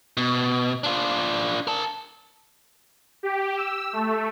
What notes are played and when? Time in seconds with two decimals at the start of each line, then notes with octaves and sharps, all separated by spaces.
0.17 B2
0.84 D4 F4
1.67 A#4 A5
3.23 G4
3.57 E6
3.93 A3